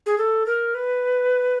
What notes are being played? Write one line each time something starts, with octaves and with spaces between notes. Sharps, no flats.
G#4
A4
A#4
B4